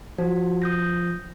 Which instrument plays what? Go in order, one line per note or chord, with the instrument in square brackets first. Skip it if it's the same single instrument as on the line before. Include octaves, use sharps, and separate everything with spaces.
[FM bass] F3 [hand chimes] F#4
[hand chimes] D#6 G6 A#6